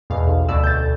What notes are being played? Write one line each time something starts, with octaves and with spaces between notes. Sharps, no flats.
E2 B2 F5
B1
D2 B2 D5 E6 E7
G6 A6
D2